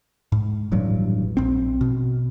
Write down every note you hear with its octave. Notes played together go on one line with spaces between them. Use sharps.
G#2
D#1 A1 G2 F#3
A#1 C4
B2